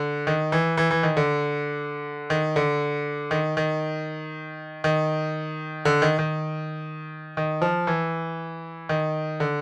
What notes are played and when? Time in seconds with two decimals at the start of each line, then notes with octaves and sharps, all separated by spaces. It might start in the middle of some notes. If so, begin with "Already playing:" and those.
Already playing: D3
0.27 D#3
0.52 E3
0.77 E3
0.91 E3
1.03 D#3
1.17 D3
2.30 D#3
2.56 D3
3.31 D#3
3.57 D#3
4.84 D#3
5.85 D3
6.02 D#3
6.19 D#3
7.37 D#3
7.62 F3
7.87 E3
8.89 D#3
9.40 D3